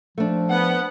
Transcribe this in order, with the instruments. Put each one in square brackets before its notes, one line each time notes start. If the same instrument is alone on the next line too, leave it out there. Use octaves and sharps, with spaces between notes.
[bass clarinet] F3 [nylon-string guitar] A3 D4
[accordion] B3 [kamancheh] F#5